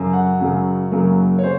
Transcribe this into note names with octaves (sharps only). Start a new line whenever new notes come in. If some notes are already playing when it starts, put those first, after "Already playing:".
Already playing: F#2 C#3 F#3
F#5
F#2 C#3 F#3
F#2 C#3 F#3 A#3
C#5
C#3 C5